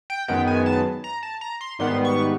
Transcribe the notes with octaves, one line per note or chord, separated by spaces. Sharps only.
G5
F#2 D#3 G#3 B3 G5
G#5
A5
A#5
A5
A#5
C6
G#2 D#3 G3 B3 C6
C#6